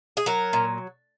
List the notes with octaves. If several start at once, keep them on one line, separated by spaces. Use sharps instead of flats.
G#4
F#3 A#4
A#2